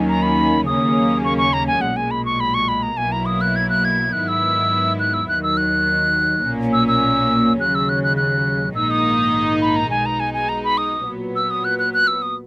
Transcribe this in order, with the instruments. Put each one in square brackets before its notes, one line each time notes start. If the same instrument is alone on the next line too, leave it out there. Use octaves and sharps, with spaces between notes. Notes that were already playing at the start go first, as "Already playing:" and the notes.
Already playing: [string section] D#2 D#3 F#3 A#3 C#4
[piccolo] A#5
B5
[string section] D#2 C#3 F#3 A#3 C#4 [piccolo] D#6
[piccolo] C#6
C#6
A#5
G#5
[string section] B1 A#2 G#3 [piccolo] F#5
[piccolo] G#5
B5
C#6
B5
C#6
B5
A#5
[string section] B1 B2 F#3 A#3 E4 [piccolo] G#5
[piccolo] A#5
D#6
F#6
G#6
F#6
G#6
[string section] G#2 D#3 F#3 B3 E4 [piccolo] F#6
[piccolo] E6
F#6
E6
[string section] D#2 D#3 F#3 [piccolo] F#6
[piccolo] E6
F#6
[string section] B1 A#2 A#3 C#4
[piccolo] E6
E6
[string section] D#2 C#3 F#3 [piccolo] F#6
[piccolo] E6
F#6
F#6
F#6
[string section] A#1 G#2 D#3 A#3 D#4 [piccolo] E6
[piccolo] D#6
B5
A#5
[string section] B1 B2 G#3 D#4 [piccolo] G#5
[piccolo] A#5
G#5
G#5
A#5
B5
D#6
[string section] A#2 F#3 B3
[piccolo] E6
D#6
F#6
F#6
F#6
E6
D#6